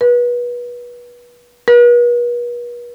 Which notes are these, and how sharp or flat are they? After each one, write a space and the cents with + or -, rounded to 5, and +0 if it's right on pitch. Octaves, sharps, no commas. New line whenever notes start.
B4 -30
B4 -45